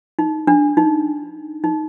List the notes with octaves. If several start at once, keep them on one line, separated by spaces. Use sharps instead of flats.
D#4
D4
D#4
D#4